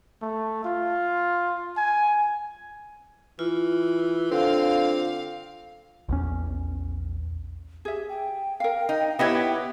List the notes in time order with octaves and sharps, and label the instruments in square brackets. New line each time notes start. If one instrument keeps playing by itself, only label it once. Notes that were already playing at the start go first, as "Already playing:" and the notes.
[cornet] A3
F4
G#5
[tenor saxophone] E3 [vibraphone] F4
[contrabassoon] D3 [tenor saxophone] C4 [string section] F5
[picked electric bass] A#1 E2 C#4
[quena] G4 [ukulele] G#4 E5
[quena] G5
[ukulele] A#4 F5
[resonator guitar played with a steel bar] D#4
[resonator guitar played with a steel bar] B3 E4 G4 [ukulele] B4 C#5 D#5